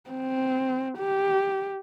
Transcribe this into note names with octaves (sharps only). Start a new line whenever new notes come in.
C4
G4